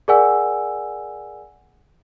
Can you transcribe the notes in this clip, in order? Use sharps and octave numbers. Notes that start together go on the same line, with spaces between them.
G#4 A#4 D5 F#5 G#5 E6